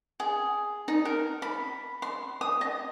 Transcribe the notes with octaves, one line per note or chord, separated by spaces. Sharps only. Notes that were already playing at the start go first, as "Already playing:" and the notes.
G#4
D#4
A#4
B5
C6
D#6
D#5